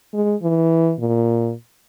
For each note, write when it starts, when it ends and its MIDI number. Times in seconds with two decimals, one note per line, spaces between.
0.13 0.35 56
0.42 0.94 52
0.99 1.52 46